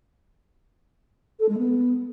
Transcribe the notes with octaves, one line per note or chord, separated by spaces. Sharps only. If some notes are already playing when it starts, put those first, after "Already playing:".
A4
G#3
B3